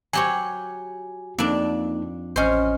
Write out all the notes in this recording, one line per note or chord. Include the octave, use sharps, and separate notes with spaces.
F#3 G4 C#5 G#5
F2 A#3 D4 D#4
A1 C#4 C5 D#5 F6